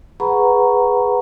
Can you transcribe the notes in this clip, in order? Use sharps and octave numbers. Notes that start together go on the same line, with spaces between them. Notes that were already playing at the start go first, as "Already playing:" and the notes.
G#4 B4 F#5 A#5 B5 C#6